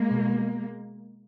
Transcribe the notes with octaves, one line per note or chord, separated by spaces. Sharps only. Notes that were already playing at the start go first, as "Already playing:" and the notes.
Already playing: G#3 A#3
B2